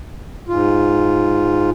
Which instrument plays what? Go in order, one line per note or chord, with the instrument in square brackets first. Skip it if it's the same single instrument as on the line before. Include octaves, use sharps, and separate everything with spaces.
[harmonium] G#2 F4